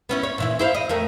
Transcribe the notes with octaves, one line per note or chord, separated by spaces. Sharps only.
B3 C#4 E4
C#5
A#2 E3 E4
E4 C5 F5
D#5
F2 A3 A#4